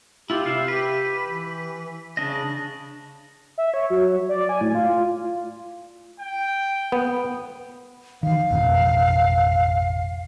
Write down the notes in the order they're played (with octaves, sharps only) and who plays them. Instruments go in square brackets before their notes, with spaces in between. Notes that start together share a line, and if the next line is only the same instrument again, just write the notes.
[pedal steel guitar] E4 F4 [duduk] G4
[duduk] C3 [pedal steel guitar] E5 F5
[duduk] G4 [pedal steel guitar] B4
[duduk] E3
[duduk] C#3 [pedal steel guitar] D4 D#5
[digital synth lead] E5
C#5
F#3
D5
G#5
A2
F4
[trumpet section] G5
[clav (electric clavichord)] B3
[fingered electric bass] D#3 E3 [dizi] F5
[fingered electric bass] A1 F2 B2